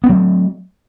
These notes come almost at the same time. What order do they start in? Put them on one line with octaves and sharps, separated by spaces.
B3 C4 F#3 A3